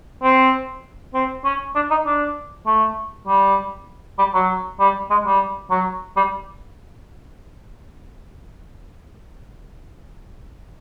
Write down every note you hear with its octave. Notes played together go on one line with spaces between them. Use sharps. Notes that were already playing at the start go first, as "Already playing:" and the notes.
C4
C4
C#4
D4
D#4
D4
A3
G3
G3
F#3
G3
G#3
G3
F#3
G3